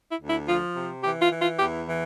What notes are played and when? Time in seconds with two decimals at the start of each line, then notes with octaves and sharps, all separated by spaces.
0.11 E4
0.21 D2
0.30 E4
0.48 F3 F4
0.76 C3
1.04 E3 G4
1.22 F4
1.32 E3
1.41 F4
1.59 E2 G4
1.88 E3